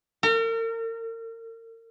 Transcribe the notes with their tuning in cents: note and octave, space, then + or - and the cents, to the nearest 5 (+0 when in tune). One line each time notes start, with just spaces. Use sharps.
A#4 -40